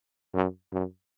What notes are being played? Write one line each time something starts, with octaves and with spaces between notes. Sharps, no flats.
F#2
F#2